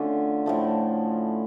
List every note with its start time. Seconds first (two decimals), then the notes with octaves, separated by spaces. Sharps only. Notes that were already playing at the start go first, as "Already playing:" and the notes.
Already playing: D3 A3 C#4 F4
0.46 A2 F3 A3